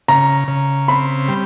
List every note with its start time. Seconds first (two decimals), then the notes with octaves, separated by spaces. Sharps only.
0.08 C#3 A#5
0.48 C#3
0.88 C4 B5
1.28 G3